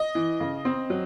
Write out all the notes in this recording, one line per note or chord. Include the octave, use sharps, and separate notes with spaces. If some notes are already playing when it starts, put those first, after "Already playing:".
Already playing: D#5
E3
C#3
C4
F#3